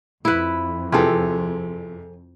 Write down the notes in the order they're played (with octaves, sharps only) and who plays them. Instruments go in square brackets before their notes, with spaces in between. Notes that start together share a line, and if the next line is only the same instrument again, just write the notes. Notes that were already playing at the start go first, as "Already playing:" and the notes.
[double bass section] F2 [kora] E4 B4
[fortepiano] C3 E3 F3 [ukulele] G#4 A4